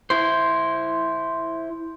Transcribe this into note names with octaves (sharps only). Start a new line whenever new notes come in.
E4 C5